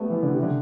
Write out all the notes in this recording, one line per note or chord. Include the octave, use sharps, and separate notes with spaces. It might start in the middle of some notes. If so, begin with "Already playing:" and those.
Already playing: G3 A3 B3
E3
D3
C3
D3